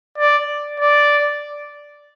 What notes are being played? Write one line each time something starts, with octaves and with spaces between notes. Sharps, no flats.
D5
D5